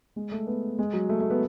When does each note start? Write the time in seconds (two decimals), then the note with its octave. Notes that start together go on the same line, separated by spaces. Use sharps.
0.16 G#3
0.32 A3
0.47 B3
0.79 G#3
0.93 F#3
1.09 A3
1.20 A3
1.30 B3